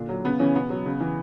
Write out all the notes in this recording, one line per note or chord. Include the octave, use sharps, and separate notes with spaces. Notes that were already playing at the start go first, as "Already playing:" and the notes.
Already playing: A#2 D3 D4
F#3
C#3 B3
C#3 E3 C#4
B2 B3
F#3
C#3
E3